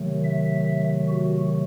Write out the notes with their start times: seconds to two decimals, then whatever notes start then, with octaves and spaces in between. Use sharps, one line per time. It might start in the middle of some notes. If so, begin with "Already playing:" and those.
Already playing: C3 D#3 F#3 A3
0.24 E5
1.08 F#4